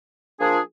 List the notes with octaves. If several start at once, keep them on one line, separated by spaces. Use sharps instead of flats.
F3 A#3 D4 F4 G#4